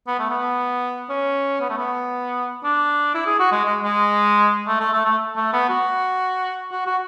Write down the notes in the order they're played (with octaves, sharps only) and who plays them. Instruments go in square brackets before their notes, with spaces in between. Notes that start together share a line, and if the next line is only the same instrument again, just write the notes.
[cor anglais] B3
A3
B3
C#4
B3
A3
B3
D4
E4
G#4
F#4
G#3
G#3
G#3
A3
A3
A3
A3
A3
B3
F#4
F#4
F#4